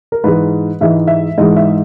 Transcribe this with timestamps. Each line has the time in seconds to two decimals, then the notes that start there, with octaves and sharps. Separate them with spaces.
0.12 A#4
0.24 G#2 E3 G#3 B4
0.81 G#2 E3 G#3 E5
1.07 E5
1.38 G#2 E3 G#3 D#5
1.57 E5